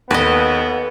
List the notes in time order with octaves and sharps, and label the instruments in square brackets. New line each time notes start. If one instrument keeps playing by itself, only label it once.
[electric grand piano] D#2 [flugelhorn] B3 [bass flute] A4 [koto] B4 D#5